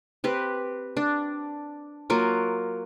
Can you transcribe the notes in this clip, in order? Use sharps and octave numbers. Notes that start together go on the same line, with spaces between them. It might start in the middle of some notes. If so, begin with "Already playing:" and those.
C4 G4 B4
D4
F#3 A#3 F4 A#4